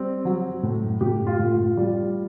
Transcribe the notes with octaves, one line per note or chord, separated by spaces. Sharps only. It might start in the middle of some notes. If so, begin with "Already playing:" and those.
Already playing: G3 C4
F#3
A2
A2 G4
F4
A2
F4
G3